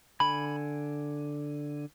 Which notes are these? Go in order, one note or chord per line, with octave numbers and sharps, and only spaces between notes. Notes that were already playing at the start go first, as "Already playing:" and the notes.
D3 G#5 B5